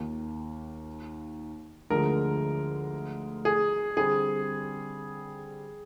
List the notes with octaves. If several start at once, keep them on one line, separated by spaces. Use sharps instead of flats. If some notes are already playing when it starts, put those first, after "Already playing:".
Already playing: D#2 D#3 A#3 F4
D2 D3 F3 G#3 A#4
G#4
D3 G3 C4 G#4